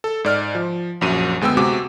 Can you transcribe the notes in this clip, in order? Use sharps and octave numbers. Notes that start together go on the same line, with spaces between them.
A4
G#2 D5 F6
F3
A#1 F#2 D#7
D2 G#3 B3 G5 E6
C3 G#3 C4 F#4 D6